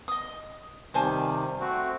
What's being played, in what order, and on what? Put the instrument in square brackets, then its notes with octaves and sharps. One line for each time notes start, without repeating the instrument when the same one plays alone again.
[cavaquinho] D#5 D#6
[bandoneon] C3 D#3 G3 [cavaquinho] C5 G#5 A5
[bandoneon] A3 C4 F#4